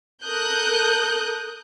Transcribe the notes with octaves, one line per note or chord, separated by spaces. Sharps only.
A4 A#4 D#6 F#6 G6